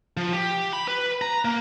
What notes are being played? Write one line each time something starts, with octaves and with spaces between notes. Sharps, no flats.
F3
G4
B5
B4
A#5
A#3